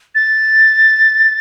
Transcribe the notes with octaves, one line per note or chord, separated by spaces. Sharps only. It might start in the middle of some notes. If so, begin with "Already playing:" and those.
A6